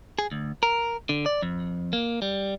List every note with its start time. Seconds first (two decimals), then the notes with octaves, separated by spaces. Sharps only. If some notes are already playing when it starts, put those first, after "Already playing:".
0.19 G#4
0.31 D2
0.63 A#4
1.09 D3
1.26 D5
1.42 F2
1.93 A#3
2.22 G3